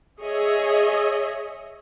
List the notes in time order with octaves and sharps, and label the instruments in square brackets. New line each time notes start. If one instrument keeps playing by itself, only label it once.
[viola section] G#4 C#5 D#5 E5